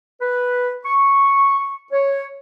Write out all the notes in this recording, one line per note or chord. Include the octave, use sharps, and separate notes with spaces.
B4
C#6
C#5